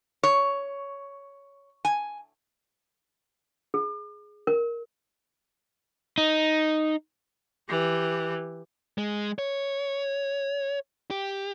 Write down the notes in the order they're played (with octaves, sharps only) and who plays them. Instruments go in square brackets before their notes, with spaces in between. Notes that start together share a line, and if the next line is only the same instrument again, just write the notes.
[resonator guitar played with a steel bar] C#5
G#5
[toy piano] G#4
A#4
[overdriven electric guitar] D#4
[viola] E3 G4
[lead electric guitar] G#3
C#5
G4